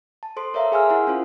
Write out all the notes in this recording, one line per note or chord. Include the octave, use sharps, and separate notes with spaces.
A5
A4 C5 C6
A#4 C#5 E5 F5 A#5
G#4 F5 G#5 C6 E6 F6
E4 A#4 F#5
C#4 F4 C5